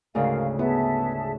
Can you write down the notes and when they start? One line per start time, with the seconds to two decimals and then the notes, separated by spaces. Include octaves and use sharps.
0.15 D2 G#2 C#3 A#4 F5
0.59 B3 G#4 E5 A5